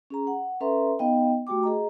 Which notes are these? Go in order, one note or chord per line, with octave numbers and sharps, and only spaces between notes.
C#4 G#4 A#5
F#5
C#4 A4 B4 E5 A#5 C6
B3 D#4 D#5 F5 G5
A3 F#4 G4 G5 D6
G#4 D#5 A#5